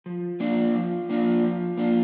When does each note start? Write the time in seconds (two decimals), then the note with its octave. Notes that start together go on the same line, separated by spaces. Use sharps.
0.06 F3
0.40 A#3 D4 F4
0.75 F3
1.09 A#3 D4 F4
1.43 F3
1.78 A#3 D4 F4